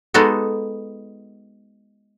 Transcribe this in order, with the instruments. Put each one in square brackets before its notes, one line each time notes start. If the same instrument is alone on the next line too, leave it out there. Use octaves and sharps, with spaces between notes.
[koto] G#3 B3 D#4 F#4 A4